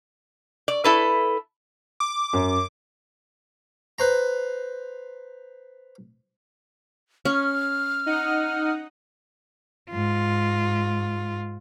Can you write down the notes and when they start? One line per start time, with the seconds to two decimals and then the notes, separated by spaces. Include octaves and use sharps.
0.68 D5
0.84 E4 A4 B4
2.00 D6
2.33 F#2
3.98 B4 C5 A#5
7.25 C#4 F6
8.06 D#4 F#5 D#6
9.91 G#2 F4